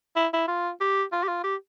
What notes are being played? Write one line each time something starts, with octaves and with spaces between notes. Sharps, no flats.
E4
E4
F4
G4
F4
G4
F4
G4